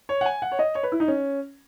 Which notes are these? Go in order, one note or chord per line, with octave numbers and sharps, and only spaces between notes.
C#5
F#5
G#5
F#5
C#5
D#5
C#5
B4
E4
D#4
C#4